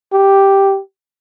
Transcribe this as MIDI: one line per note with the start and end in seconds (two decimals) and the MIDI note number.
0.13 0.80 67